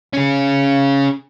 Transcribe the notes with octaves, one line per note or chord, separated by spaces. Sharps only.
C#4 G#4